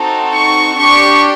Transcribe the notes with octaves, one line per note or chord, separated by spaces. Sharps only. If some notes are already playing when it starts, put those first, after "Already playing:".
Already playing: C4 D#4 F#4 A4
C#6
D4 G4 C#6